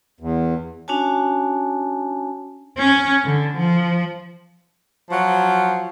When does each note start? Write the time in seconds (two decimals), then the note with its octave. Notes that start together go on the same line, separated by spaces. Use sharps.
0.20 E2
0.88 C#4 D4 F#4 C#5 G#5 A5
2.78 C#4
3.25 D3
3.57 F3
5.11 F3 F#3 F5